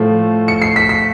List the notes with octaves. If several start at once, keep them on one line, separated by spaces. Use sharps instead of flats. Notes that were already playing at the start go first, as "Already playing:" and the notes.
Already playing: A2 F3 A3
C#7
C7
B6
B6